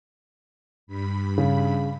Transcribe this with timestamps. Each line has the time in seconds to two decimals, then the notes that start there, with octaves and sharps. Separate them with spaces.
0.87 G2 B5
1.38 C#3